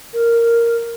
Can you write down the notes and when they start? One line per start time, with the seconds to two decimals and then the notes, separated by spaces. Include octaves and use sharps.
0.13 A#4